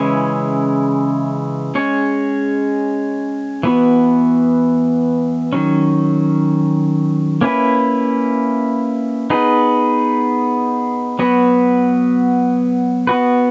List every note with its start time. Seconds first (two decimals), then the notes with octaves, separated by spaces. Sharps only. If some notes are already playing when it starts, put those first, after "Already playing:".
Already playing: C#3 E3 G#3 C#4 E4
1.75 G#3 C#4 G#4 C#5
3.63 E3 B3 F#4
5.53 D#3 F#3 C#4
7.41 A#3 C#4 E4 B4
9.30 B3 D#4 G#4 B4
11.19 F#3 B3 F#4 B4
13.07 B3 F#4 B4